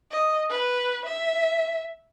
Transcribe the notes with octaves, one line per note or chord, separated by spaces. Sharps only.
D#5
B4
E5